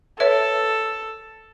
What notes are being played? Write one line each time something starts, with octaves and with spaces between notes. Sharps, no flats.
A4 B4 C#5 E5